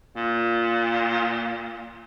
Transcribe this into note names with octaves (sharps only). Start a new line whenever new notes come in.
A#2